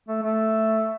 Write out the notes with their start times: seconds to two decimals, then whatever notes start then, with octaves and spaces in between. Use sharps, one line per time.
0.08 A3
0.23 A3